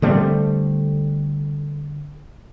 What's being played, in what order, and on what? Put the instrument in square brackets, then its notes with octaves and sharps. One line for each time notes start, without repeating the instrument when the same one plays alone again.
[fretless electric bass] D3 G3 A3 C4